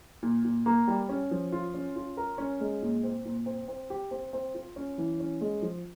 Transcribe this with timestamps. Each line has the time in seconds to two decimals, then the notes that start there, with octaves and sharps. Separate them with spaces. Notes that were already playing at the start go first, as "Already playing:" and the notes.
0.23 A#2
0.45 A#2
0.66 A#3
0.88 G3
1.09 C#4
1.31 F3
1.52 F4
1.74 C#4
1.96 F4
2.17 A#4
2.38 C#4
2.60 G#3
2.82 A#2
3.03 C4
3.25 A#2
3.46 C4
3.68 C4
3.90 G4
4.11 C4
4.33 C4
4.54 F4
4.76 C#4
4.98 E3
5.20 C#4
5.41 G#3
5.62 F3